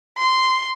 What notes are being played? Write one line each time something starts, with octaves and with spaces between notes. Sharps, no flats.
C6